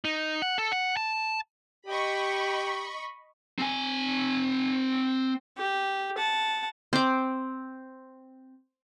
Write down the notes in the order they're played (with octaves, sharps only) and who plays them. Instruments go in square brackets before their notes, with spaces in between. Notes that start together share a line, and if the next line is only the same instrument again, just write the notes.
[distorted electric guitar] D#4
F#5
A4
F#5
A5
[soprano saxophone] G4 [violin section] D#5 B5 C#6
[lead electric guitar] C4 G#5
[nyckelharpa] G4
F#5 A5
[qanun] C4 D6